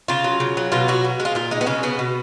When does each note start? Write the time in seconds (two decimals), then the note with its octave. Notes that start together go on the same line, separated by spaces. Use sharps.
0.08 C#3 F4
0.24 F#3
0.40 C#3
0.57 F#3
0.72 B2 F4
0.88 F#3 F#4
1.04 B2
1.20 G#3
1.25 F4
1.35 A#2 F4
1.51 G#3 D#4
1.61 B3
1.66 C#3 C#4
1.83 C#3 B3
1.99 B2